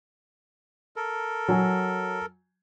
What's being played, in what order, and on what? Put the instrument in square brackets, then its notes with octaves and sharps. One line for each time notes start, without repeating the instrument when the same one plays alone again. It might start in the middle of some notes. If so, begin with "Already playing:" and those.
[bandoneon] A4 A#4
[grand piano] F#3 G#5